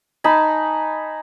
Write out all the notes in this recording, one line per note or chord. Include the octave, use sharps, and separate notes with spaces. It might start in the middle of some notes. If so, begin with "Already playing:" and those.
D#4 G#5 A5 B5